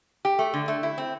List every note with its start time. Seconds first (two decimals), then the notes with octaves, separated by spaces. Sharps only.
0.25 G4
0.39 A3
0.54 D3
0.68 A3
0.83 E4
0.98 C4